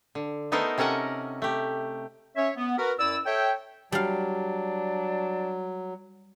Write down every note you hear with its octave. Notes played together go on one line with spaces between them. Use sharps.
D3
A3 B3 D#4 A4 A#4 C5
C3 C#4 A4 A#4 F#5 A#5
A3 G4
C#4 C#5 E5
B3
F#4 A#4 B4
F#2 E4 D5 E6
A4 C#5 E5 G5
F#3 G3 D4 F5